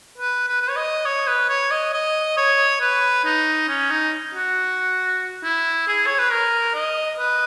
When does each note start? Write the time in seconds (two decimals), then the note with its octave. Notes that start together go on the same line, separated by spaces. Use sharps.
0.18 B4
0.48 B4
0.62 B4
0.68 C#5
0.76 D#5
1.05 C#5
1.27 B4
1.49 C#5
1.71 D#5
1.93 D#5
2.37 C#5
2.81 B4
3.24 D#4
3.68 C#4
3.90 D#4
4.35 F#4
5.44 E4
5.88 G#4
6.06 C#5
6.19 B4
6.31 A#4
6.74 D#5
7.19 B4